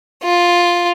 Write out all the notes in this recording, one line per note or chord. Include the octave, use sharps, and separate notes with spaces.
F4